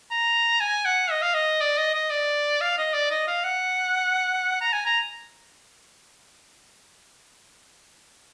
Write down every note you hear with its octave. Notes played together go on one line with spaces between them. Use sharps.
A#5
G#5
F#5
D#5
F5
D#5
D5
D#5
D#5
D5
F5
D#5
D5
D#5
F5
F#5
A#5
G#5
A#5